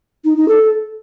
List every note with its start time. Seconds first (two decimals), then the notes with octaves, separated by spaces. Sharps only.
0.25 D#4
0.36 D#4
0.48 A4